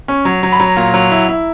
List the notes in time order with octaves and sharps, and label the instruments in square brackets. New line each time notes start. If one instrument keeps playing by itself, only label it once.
[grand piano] C#4
F#3
F#3
B5
F#3 A#5
A#2
F#3
E4
E4